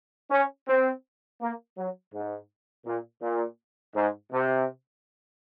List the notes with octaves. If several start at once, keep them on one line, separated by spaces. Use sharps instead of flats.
C#4
C4
A#3
F#3
G#2
A#2
A#2
G#2
C3